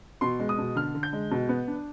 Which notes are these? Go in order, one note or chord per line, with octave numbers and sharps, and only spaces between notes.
B2 C6
G#3
D#6
B2
D3 F6
D3
G6
G#3
B2
B3
D4